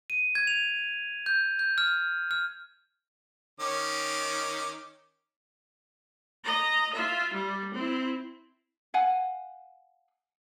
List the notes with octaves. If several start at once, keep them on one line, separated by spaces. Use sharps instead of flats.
D#7
G#6
F7
G6
G6
F6
F6
D#3 C#4 D6
D#5 A#5
F4 E5
G3
C4 E4
F5 F#5 G#5